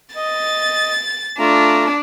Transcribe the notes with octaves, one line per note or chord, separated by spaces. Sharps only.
D#5 A6
A3 D4 F4 A#5